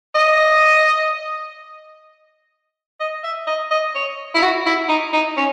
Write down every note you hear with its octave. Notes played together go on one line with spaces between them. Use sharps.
D#5
D#5
E5
D#5
D#5
C#5
E4
F#4
E4
D#4
D#4
C#4